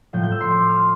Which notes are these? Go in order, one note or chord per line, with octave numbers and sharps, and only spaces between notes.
A2 F3 G6
G6
E6
C6
D6
F6